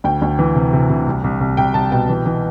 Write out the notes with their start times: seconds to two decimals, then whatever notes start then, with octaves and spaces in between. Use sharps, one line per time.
0.04 D2 G5
0.22 D2
0.39 E3
0.55 C3
0.73 C3
0.90 C3
1.07 C2
1.24 C2
1.41 C2
1.57 C2 G5
1.74 C2 A5
1.92 B2 G5
2.09 E3
2.26 E3